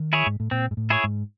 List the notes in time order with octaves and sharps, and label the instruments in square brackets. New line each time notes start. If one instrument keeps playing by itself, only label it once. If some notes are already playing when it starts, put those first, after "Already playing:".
Already playing: [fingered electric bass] D#3
[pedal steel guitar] E4 G#4 C#5
[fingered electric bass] G#2
A2
[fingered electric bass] A#2 [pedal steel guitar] C4
[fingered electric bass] G#2
A2
[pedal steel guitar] E4 G#4 C#5
[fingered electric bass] G#2